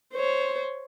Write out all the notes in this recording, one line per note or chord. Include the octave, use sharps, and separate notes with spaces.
C5 C#5